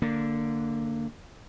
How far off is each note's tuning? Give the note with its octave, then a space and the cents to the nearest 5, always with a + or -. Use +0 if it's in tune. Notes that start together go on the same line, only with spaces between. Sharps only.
D3 +0 A#3 -20